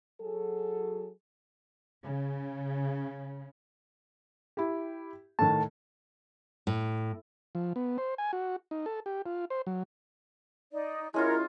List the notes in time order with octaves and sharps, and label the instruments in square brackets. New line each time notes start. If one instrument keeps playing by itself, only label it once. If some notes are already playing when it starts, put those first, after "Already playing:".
[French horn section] F#3 G#4 A4
[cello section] C#3
[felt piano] E4 G4
[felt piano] A2 D#3 [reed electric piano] A5
[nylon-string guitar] A2
[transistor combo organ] F3
B3
C5
G#5
F#4
D#4
A4
G4
F4
C5
F#3
[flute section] D#4 D5
[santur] G#3 C#4 F4 [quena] E4 [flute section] A#4 C#5